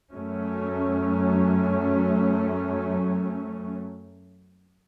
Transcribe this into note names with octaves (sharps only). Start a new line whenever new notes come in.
F#2 F#3 A3 C#4